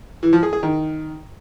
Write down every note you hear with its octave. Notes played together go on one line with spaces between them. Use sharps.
E3
F3
G#4
G#4
D#3